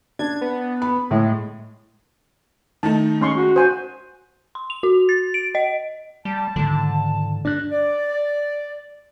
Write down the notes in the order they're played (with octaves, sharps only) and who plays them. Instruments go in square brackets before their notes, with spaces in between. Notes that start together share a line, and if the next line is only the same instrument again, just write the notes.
[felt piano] D4 [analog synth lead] G#6
[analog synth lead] B3
[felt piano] B5
[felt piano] A2 [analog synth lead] G#3
[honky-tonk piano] D#3 A3 D#4 [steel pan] A5
[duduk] G#3 [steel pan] C#4 C6 C#6
[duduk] F#4
[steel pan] C5 G#5
[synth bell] C6
F7
F#4
A6
D7
D#5
[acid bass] G3 [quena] A5
[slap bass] G#2 D#3 F3 [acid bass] D3
[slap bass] G2 [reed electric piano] D4 F#6
[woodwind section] D5